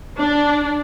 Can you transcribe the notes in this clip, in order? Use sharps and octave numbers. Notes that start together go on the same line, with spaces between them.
D4